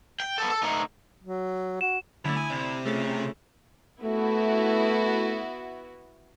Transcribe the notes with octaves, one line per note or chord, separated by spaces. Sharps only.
G5
B3 A4
A4
A3 D#4
F#3
F#4 E7
D3 F#3 A3 C#4 E4
G#5 D#6
C3 D5
C#3 A3 F4 A4
A3 B3 E4 F#4